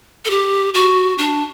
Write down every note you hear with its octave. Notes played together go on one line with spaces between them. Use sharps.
A4
G4
F#4
D4